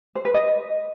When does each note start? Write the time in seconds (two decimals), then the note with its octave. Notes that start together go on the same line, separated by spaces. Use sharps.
0.15 C5
0.25 B4
0.34 D#5